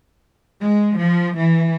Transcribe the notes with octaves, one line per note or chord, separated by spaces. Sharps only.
G#3
F3
E3